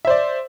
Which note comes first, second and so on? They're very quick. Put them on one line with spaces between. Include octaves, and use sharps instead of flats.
E5 C5 D5